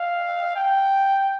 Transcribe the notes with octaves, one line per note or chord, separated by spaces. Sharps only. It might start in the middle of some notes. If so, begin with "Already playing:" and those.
Already playing: F5
G5